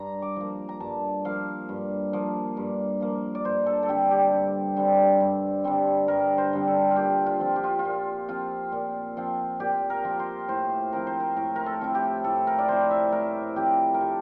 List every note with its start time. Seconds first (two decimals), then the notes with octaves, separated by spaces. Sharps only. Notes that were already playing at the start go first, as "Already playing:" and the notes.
Already playing: G2 A#5
0.22 D6
0.36 F3 A#3
0.69 A#5
0.80 G2 A5
1.25 F3 A#3 F5
1.69 G2
2.13 F3 A#3
2.57 G2
3.01 F3 A#3
3.35 D5
3.44 G2 C5
3.66 A4
3.83 A4
3.89 D3 G3 C4 G4
4.11 G4
4.33 G2
4.76 D3 G3 C4
5.21 G2
5.64 D3 G3 C4
6.08 G2 A#4
6.38 C5
6.53 D3 G3 C4
6.68 A4
6.91 F4
6.96 A#2 G4
7.26 F4
7.40 F3 C4 F4
7.56 G4
7.64 F4
7.79 F4
7.85 A#2
8.28 F3 C4 F4
8.72 A#2
9.17 F3 C4 F4
9.60 A#2 G4
9.90 A#4
10.04 F3 C4 F4
10.19 C5
10.48 A2 C5
10.92 F3 C4 E4 A#4
11.07 C5
11.20 A#4
11.36 A2 A#4
11.56 A#4
11.66 A4
11.81 F3 C4 E4
11.95 G4
12.24 A2 A4
12.47 A#4
12.58 D5
12.68 F3 C4 E4 C5
12.91 E5
13.12 A2 A#4
13.56 F3 C4 E4 G4
13.94 A#4
14.01 C3 A4